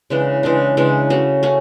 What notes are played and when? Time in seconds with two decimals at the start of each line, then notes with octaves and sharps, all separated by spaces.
0.10 C#3 E3 G#3 D4
0.43 C#3 E3 G#3 D4
0.77 C#3 E3 G#3 D4
1.10 A3 C#4 F#4
1.43 A3 C#4 F#4